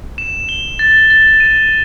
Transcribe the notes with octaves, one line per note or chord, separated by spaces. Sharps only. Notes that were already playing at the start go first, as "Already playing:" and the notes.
E7
G7
A6
A6
D#7